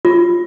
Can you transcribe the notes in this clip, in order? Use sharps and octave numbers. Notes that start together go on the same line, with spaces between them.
F4